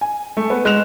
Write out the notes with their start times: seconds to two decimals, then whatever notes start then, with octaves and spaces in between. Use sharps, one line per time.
0.01 G#5
0.37 A3
0.50 B3
0.65 G#3 F#6 E7 F7